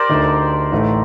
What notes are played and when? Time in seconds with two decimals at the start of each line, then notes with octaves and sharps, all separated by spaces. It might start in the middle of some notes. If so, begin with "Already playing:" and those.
Already playing: G4 A#4 C5 D5
0.09 D2 D3 A3 D#4
0.72 A1 A2 A3 D#4 A4